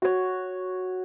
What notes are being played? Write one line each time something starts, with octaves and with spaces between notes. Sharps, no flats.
F#4 C#5